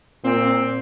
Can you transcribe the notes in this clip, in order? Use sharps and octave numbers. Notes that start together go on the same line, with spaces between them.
A#2 C4